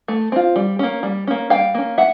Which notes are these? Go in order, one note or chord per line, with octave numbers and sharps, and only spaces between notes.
A3
C4 F4
G3
A#3 C#4
G3
A#3 C#4
G3 F5 G5
A#3 C#4
E5 F#5